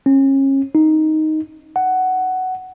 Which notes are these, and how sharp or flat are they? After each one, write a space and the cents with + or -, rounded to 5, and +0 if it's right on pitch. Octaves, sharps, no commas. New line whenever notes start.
C#4 -30
D#4 +5
F#5 +10